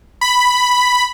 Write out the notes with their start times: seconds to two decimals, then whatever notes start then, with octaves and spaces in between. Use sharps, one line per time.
0.21 B5